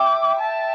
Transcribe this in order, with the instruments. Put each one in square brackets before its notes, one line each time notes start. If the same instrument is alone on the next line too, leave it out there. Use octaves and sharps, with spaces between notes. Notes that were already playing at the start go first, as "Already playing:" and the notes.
Already playing: [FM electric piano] E5 G5 [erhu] D6
[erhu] A5